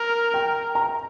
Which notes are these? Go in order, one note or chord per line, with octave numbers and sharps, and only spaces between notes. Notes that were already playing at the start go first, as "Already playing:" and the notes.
Already playing: A#4
G5
A#5